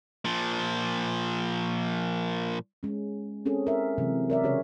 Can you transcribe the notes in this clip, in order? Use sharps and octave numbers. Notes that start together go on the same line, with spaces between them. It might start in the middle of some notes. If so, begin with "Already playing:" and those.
A#2 F3
G#3 C#4
C4 C#4 G#4 A4
A#4 E5
C3 E3 F#3 G#3
A#4 D5 E5
C#3 F#4 G#4 C#5